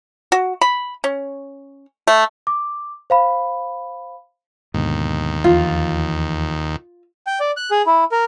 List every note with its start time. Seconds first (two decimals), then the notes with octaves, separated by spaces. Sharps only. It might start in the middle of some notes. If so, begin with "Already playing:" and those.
0.32 F#4
0.61 B5
1.04 C#4
2.07 A3
2.47 D6
3.10 C5 F5 B5
4.74 D#2 G#2 B2 D3
5.44 E2 E3 F3 F4
7.27 G5
7.40 D5
7.57 F#6
7.71 G#4
7.86 E4
8.12 A#4